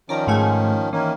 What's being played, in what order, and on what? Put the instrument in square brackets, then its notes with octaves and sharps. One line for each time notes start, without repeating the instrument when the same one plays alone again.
[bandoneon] D#3 F3 C#4 [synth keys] D5 A#5
[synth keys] G#2 A3 G#5
[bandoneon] D#3 A#3 C#4 [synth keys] E3